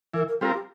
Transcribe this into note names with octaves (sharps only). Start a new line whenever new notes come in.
E3 A#4
A#4
G3 C4 F4 A4 A#4
G4